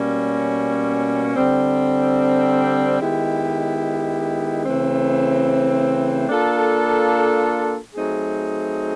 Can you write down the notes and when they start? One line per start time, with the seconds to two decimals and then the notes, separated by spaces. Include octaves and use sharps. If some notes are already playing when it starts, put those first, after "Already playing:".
Already playing: B2 G3 A#3 C#4
1.35 D3 G3 C4
3.00 D#3 G#3 B3 E4 G4
4.64 C#3 E3 A3 C4
6.29 A#3 D4 F4 A4
7.94 F#3 A3 C4 D#4 G#4